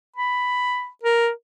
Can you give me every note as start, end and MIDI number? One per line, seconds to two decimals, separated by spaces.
0.16 0.88 83
1.03 1.30 70